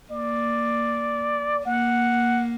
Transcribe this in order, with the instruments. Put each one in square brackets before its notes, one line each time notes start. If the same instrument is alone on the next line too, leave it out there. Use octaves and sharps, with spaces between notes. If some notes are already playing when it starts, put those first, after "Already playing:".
[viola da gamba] A#3 [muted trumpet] D5
[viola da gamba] A#3 [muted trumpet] F#5